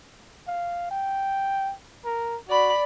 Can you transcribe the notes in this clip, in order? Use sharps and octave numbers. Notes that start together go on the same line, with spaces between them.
F5
G5
A#4
F#4 D5 B5